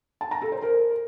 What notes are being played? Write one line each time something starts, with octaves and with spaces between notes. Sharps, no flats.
A5
A#5
A4
C5
A#4